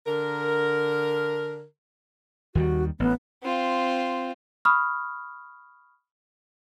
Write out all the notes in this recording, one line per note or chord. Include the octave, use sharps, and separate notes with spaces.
D3 A#4
D#2 D#3 G3 F#4
A1 B3
C4 F4
B5 C#6 D#6 F6